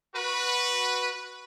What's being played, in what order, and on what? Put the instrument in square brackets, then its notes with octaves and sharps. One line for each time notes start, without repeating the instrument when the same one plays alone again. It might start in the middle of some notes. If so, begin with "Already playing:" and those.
[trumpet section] F#4 B4